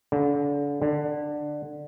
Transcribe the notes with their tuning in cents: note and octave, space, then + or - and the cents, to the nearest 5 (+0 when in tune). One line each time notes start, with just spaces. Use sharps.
D3 -35
D3 +15